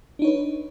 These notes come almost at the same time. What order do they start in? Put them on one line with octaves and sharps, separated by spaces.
D4 D#4 C#5 B4